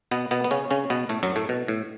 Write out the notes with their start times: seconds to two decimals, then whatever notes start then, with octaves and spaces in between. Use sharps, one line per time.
0.11 B2 B3
0.31 B2 B3
0.44 B3
0.51 C#3 C#4
0.71 C#3 C#4
0.90 B2 B3
1.09 A2 A3
1.23 F#2 F#3
1.36 A2 A3
1.49 B2
1.68 A2